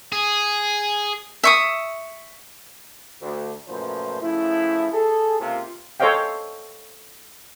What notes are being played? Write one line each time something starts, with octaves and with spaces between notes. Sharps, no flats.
G#4
E5 C#6 D#6
D2
F#2 A#2 F3 A3 B4 C5
C#3 F3 A3 E4
G#4 A4
C#2 C3 A#3 F4
A4 C5 C#5 D#5 F5 G5